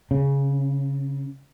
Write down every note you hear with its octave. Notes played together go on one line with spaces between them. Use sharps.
C#3